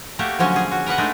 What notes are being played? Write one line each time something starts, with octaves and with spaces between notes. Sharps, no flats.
A3 A#3 F#4 G4
D3 F3 F#3 C#4
G#4
F#4
A#4 B4 D#5 F#5
G#3 A3 D4 D#4